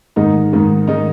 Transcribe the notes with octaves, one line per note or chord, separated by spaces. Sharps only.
G#2 D#3 G#3 D#4
G#2 D#3 G#3
D#3 G#3 D#4